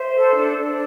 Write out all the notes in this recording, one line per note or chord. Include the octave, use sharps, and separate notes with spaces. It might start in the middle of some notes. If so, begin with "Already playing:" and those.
Already playing: C5 E5
A4
D4
D4